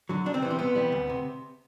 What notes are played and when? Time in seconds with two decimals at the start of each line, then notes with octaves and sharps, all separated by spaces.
0.09 D3 F#3
0.26 C2 D4
0.34 C4
0.42 C3 E3 G3 B3
0.50 C4
0.59 C2 B3
0.75 C3 E3 G3
0.92 D2
1.10 C3